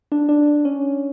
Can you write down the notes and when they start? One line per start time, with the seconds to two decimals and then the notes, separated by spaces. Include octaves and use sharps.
0.12 D4
0.29 D4
0.65 C#4